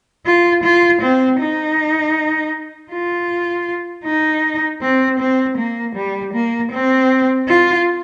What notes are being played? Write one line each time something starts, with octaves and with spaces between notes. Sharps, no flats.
F4
F4
C4
D#4
F4
D#4
C4
C4
A#3
G3
A#3
C4
F4